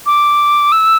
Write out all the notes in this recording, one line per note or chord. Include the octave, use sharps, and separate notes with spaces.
D6
E6